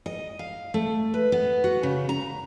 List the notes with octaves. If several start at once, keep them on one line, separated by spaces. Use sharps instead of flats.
D#5
F5
A3
B4
B3
F#4
C#3
A#5